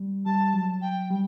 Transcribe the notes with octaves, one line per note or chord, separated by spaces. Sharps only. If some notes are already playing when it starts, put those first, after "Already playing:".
Already playing: G3
G3 A5
F#3
G5
G3